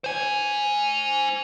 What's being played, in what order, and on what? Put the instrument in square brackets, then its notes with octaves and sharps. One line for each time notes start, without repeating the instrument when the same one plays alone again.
[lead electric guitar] C5 G#5